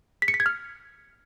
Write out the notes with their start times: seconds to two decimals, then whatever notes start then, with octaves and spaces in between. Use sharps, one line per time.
0.22 B6
0.28 C#7
0.34 B6
0.40 G#6
0.46 F6